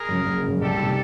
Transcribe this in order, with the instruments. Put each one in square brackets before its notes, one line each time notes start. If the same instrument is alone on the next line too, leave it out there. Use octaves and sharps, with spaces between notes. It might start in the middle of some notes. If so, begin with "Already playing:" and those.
Already playing: [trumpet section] G#4 A#4
[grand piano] F#2 C#3
F#1
F#2 C#3
[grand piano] C2 [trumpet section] G4 A4
[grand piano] D#3
C3